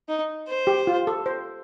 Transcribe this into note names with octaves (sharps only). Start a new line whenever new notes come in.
D#4
C5
G4
F4
A4
C5